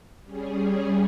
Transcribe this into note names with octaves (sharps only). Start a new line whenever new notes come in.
G3 C#4 G#4